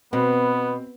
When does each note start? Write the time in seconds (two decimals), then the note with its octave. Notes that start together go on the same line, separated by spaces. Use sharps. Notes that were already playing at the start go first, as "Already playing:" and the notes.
0.13 B2 B3 C4 B4